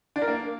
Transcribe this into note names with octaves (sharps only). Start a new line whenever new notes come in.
D4
A#4
A#3